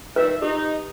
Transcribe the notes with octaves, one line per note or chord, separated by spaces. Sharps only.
D#3 G3 B4 E5
D#4 G4